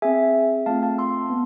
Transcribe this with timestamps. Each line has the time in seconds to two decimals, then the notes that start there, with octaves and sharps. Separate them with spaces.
0.02 C4 G#4 E5 G#5
0.66 A3 C4 F4 F5 A5
0.83 F5 A5
0.98 C6 E6
1.30 B3